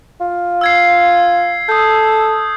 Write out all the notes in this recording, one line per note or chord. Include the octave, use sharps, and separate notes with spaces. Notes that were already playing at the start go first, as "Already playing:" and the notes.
F4
E6 G#6 C7
A4 D#6 G6